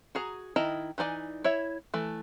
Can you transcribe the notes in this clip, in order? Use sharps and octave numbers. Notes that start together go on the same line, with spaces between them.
F#4 G#4 A#5
D#3 E4 D#5 A5 A#5
E3 D#4 D5 G#5
E4 C#5 E5
E3 A3